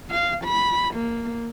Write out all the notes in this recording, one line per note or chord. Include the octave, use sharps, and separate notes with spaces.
F5
B5
A#3